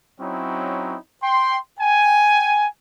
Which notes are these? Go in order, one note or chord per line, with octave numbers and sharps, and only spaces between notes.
F#3 C4 C#4 D#4 E4
G5 C6
G5 G#5